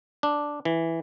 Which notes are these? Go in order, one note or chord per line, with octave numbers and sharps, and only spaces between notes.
D4
E3